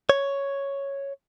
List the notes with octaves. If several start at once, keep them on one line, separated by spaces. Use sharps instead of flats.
C#5